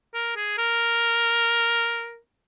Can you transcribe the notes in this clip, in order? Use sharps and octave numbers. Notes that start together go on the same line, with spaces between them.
A#4
G#4
A#4